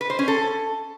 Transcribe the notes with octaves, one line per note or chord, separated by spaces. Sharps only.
B4
C5
C#4
A4